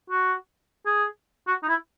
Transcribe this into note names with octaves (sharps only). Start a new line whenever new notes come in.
F#4
G#4
F#4
D#4
E4